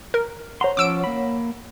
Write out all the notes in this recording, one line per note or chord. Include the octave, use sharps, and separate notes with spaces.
A#4
C5 C#5 F#5 A#5 C6
F3 C#4 D6 E6 D7
A#3 B5